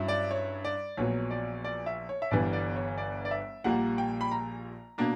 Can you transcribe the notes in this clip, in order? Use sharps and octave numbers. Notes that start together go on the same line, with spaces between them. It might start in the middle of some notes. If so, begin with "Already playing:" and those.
Already playing: G2 F#3 C#4 E4
D5
C#5
D5
A#1 A#2 F#3 B3 C#5
D5
D5
E5
C#5
E5
G1 G2 E3 G3 B3 D5
D5
C#5
D5
D5
E5
A#1 A#2 G3 A#3 F#5
G5
B5
A#5
B2 A#3 D4